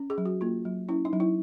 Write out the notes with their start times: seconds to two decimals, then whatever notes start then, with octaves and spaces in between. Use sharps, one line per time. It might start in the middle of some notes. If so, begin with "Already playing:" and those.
Already playing: C#4
0.10 G#4
0.18 F#3
0.26 F#4
0.41 A#3 F4
0.65 F#3
0.89 C#4 E4
1.05 D#4
1.13 F#3
1.20 E4